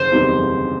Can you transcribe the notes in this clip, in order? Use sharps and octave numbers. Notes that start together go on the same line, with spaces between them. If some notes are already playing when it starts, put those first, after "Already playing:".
Already playing: F#1 C5
E2 C3 D#3 G3
F#1